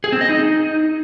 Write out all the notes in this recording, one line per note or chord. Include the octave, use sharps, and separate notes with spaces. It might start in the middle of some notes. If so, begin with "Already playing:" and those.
G#4
C4
D#5
D#4